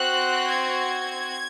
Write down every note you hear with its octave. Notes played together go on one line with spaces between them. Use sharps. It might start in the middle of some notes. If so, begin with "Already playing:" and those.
Already playing: C4 F#4 F#6
G#6